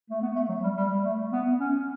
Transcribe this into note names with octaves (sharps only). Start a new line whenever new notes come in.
A3
B3
A3
F#3
G3
G3
A3
B3
C#4